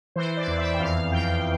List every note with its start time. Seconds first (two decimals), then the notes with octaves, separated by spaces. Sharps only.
0.16 E3 C5
0.37 D5
0.47 E2
0.58 E5
0.74 G5
0.80 F2 F5
1.12 F2 G5